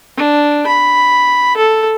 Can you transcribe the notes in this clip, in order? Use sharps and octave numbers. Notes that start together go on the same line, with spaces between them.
D4
B5
A4